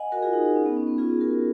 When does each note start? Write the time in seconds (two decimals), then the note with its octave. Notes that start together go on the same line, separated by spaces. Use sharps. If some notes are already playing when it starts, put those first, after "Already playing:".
Already playing: D#5 F#5 G#5
0.12 F#4 A#4
0.22 F4 G#4
0.33 D#4
0.45 D#4
0.56 C#4
0.66 B3
0.77 C#4
0.87 B3
0.98 F4 G#4
1.20 F#4 A#4